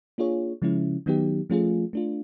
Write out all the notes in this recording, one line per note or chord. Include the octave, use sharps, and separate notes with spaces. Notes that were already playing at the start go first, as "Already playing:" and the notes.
A#3 D4 F4 G#4 C#5
C#3 F3 G#3 C#4 E4
D#3 F#3 B3 D#4 G4
F3 A3 C#4 F4 G#4
A3 D4 F4